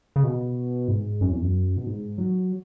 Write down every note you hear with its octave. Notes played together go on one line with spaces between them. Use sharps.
C#3
B2
G#2
F#2
E2
F#2
B2
G#2
F#3